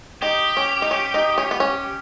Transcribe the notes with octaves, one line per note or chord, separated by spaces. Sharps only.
D#4 G4
C#4
D#4
C#4
D#4
C#4
B3
C#4